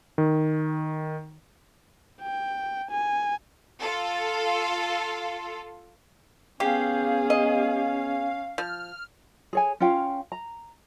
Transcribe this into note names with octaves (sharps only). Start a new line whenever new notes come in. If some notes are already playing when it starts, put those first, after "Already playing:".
D#3
G5
G#5
F4 A4
B3 C#4 G4 G#4 F5
D#5
F3 F6
G#4 C#5 G#5
C#4 F4 F5 G5
A#5